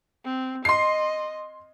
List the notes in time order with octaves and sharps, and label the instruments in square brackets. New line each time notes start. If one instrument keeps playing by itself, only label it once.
[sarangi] C4
[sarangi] D#5 [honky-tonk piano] C6 C7